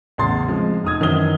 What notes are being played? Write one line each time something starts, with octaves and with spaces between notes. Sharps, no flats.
A1 E2 C#3 C6 A6
F3 G#3 C4
F1 D#4 D#6 G#6
F#2 D#3 E3 C5 D#6 G7